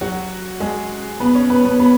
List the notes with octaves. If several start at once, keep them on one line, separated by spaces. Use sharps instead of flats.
F#3 F#4
G#3 G#4
B3 B4
C#4 C#5
B3 B4
B3 B4
B3 B4